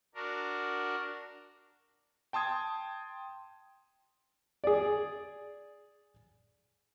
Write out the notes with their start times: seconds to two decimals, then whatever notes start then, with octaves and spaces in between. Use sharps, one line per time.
0.15 D4 F#4 A#4
2.33 G5 A5 C6 D#6 G#6
4.64 G#4 D5